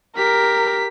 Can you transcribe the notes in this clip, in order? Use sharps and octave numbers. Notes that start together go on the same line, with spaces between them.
G4 A#4 B6